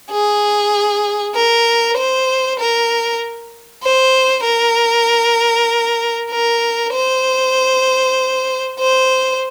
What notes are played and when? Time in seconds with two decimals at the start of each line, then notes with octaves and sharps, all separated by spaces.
0.11 G#4
1.35 A#4
1.97 C5
2.59 A#4
3.83 C5
4.45 A#4
6.31 A#4
6.93 C5
8.79 C5